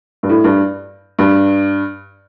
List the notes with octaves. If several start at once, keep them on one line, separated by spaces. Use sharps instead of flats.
G2
A2
G2
G2